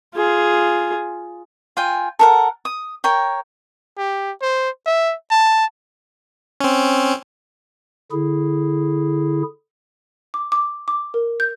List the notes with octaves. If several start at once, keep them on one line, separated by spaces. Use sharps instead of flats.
F4 G#4
F4 G5 G#5
A4 A#4 F#5
D#6
A#4 C#5 G5
G4
C5
E5
A5
C4 C#4
D3 E4 G#4
D6
D6
D6
A#4
G6